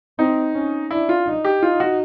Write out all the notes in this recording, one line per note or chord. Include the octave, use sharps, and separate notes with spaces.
C4 D#4
C#4
D4 E4
F4
D#4
G4
D#4 F4
F#4